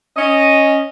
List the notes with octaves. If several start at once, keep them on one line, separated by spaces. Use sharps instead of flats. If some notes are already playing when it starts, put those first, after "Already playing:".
C#4 D#5